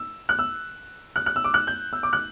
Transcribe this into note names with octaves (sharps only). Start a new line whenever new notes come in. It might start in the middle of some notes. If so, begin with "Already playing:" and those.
Already playing: E6
F#6
E6
F#6
F#6
E6
D6
F#6
G6
E6
D6
F#6